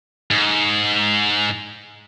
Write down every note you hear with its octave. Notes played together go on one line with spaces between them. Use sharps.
G#2